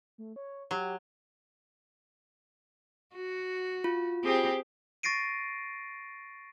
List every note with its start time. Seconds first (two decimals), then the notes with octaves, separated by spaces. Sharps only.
0.18 A3
0.36 C#5
0.71 F#3 G4
3.15 F#4
3.84 F4
4.23 C4 G4 G#4
5.03 C#6 A6 A#6 C7 D7 D#7